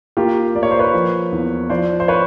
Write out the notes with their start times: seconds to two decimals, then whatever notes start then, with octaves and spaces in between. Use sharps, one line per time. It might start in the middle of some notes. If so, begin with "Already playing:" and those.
0.17 A#3 F4 G4
0.55 A#3 D5
0.63 C#5
0.71 C5
0.79 B4 C#5
0.93 F3
1.32 E2
1.70 F3 C5 D5
2.00 C5
2.08 B4 C#5